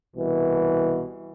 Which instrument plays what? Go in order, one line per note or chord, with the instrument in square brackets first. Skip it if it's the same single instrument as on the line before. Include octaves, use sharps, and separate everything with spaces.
[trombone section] C2 B2 E3